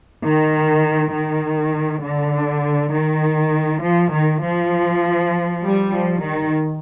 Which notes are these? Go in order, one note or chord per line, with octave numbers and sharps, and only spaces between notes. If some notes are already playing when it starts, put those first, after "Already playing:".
D#3
D#3
D3
D#3
F3
D#3
F3
G3
F3
D#3